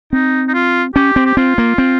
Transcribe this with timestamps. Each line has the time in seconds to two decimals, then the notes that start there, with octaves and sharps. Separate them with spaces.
0.13 C4 D#4
0.48 D#4
0.54 F4
0.95 C#4 G4
1.16 C4
1.26 G4
1.37 C4 F4
1.58 A#3
1.78 C4